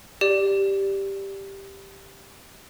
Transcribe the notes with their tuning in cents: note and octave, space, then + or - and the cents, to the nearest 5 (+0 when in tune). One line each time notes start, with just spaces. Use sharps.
G4 +0 D5 +0